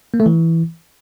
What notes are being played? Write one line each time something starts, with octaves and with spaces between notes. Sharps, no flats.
A#3
A3
E3